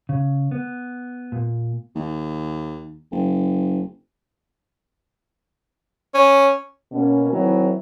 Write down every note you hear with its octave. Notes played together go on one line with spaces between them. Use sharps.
C#3
B3
A#2
D#2
F#1
C#4
B2 A#3 C#4
D#3 E3 F#3 C4 D#4 E4